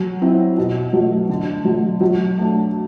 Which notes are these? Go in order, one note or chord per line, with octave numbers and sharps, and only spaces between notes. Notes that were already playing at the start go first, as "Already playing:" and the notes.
Already playing: F#3
C4 E4
B2
F#3 A3
D3
F#3 A3
F#3
A3 D4